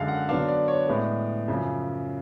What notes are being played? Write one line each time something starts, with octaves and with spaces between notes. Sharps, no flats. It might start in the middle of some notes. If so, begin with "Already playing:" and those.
Already playing: F#2 D3 G#3 F5
F#5
D3 F#3 B3 D4 F5
D5
C#5
A2 G#3 B3 D5
F#2 C#3 F3